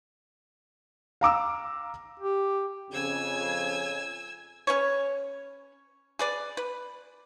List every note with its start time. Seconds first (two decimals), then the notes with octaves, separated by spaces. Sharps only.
1.21 F5 A#5 D6 E6
2.19 G4
2.91 F2 C#3 G#5 E6 G#6
4.67 C#4 B4 C#5
6.19 G#4 B4 D5
6.57 B4